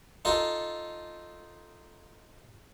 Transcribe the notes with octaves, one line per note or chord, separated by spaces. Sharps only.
D#4 F4 A4